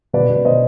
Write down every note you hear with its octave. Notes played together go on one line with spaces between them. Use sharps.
B2 B4 D5
B2
B2 C5 D#5